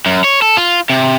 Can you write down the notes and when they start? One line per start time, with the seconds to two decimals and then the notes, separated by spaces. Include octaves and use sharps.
0.06 F#2
0.24 C#5
0.42 A4
0.57 F4
0.90 C3